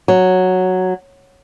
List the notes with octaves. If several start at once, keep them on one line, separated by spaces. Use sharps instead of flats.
F#3